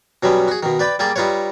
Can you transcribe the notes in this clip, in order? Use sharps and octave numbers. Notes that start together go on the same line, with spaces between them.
B2 F#3 G3 B3 C#4
F#4 G#4
B2 D#3
B4 D5 G5 B5
G3 A#3 G4 G#4 D5
G3 D#4 F4 B4 C#5